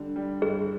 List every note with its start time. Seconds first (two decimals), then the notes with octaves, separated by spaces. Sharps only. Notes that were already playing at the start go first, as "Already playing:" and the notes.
Already playing: D3 G3
0.16 G3
0.42 G2 G#4